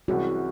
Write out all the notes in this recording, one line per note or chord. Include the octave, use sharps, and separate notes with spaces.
C2 C3 E3 G#3 C#4 F#4